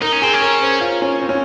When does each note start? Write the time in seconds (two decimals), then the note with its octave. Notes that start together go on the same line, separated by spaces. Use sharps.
0.02 D#4 A#4
0.12 C#4
0.22 C4 G#4
0.34 C#4
0.42 A#4
0.62 C5
0.81 F4
1.02 C#4
1.22 C4
1.29 C#4